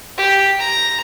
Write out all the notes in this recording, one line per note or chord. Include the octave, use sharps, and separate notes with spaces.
G4
A#5